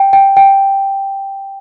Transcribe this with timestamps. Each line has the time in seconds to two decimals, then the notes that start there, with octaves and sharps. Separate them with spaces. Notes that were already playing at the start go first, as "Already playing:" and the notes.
Already playing: G5
0.13 G5
0.37 G5